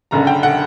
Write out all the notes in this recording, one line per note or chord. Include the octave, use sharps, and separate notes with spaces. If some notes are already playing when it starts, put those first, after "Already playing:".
F#1 F#2 D3 A#5
G5
D3 F#5